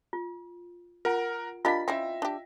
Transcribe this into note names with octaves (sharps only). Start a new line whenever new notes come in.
F4
F4 A#4 F#5 D7
D4 F4 G4 A#4 D#5 F5 B5 B6
C4 C#4 E4 E5 G5 A#6
D4 G4